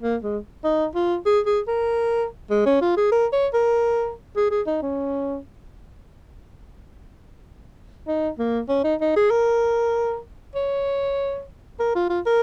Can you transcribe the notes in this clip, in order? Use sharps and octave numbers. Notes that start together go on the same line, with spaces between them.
A#3
G#3
D#4
F4
G#4
G#4
A#4
G#3
C#4
F4
G#4
A#4
C#5
A#4
G#4
G#4
D#4
C#4
D#4
A#3
C#4
D#4
D#4
G#4
A#4
C#5
A#4
F4
F4
A#4